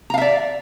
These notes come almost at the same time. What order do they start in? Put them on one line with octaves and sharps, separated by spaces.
A#5 F5 E5 D5